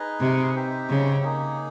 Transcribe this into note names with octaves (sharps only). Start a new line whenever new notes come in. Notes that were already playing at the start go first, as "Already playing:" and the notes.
Already playing: D#4 G#4 B4 D#5
C3
D#4 G4 C5 E5 G5
C#3
A#3 D#4 G#4